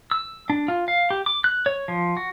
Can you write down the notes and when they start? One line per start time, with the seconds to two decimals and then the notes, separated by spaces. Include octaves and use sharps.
0.11 E6
0.50 D4
0.68 F4
0.88 F5
1.10 G4
1.26 D6
1.44 F#6
1.66 C#5
1.88 F3
2.17 F#4